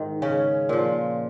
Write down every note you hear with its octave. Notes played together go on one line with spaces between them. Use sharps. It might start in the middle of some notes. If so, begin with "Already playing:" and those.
Already playing: G#2 D#3
C#3 C#4
A#2 F3